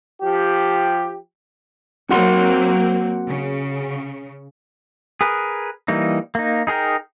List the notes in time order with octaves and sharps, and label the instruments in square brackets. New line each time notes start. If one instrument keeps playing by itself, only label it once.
[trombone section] F3 G4
[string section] F#3 A#3 C4 [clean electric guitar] F#4 F#5 C6
[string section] C#3
[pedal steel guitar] G#4 A#4 B4
E3 G3 A#3 D#4
A#3 D#4
D#4 G#4 A#4 G5